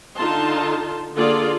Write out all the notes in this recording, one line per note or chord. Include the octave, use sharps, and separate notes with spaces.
D3 D#4 F4 A5 C6
D3 A#3 F4 G#4 A4 D5